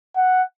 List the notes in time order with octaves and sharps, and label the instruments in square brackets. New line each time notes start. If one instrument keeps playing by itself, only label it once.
[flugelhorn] F#5